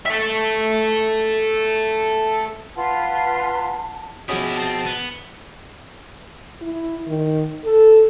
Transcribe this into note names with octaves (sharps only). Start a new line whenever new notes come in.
A4 E5
F4 B4 F#5 A5 C6
B2 F3 C#4 E4 G4 G#4 D#6
C4 A5
B3
E4
D#3
A4